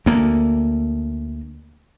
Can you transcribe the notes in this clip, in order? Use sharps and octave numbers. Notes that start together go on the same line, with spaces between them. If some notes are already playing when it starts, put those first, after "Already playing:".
D2 A#3